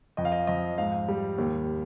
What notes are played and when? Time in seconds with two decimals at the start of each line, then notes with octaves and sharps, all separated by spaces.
0.17 F2 D#5
0.25 F5
0.32 D#5
0.47 F2 D#5
0.78 G#2 F5
1.08 G3
1.38 D#2